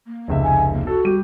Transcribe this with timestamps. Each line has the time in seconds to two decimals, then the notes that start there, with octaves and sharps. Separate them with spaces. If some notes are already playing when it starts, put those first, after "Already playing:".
0.07 A#3
0.28 F1 C#2 E5
0.42 G#5
0.74 A#3
0.87 F#4 A4
1.05 G3 G4 D#7